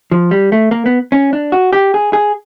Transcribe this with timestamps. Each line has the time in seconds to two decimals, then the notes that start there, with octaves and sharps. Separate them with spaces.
0.12 F3
0.31 G3
0.52 A3
0.71 A#3
0.86 B3
1.12 C#4
1.33 D4
1.52 F#4
1.73 G4
1.94 G#4
2.13 G#4